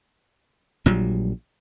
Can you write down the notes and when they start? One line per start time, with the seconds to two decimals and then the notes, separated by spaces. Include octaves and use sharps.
0.86 A#1 A#2 F#3 G3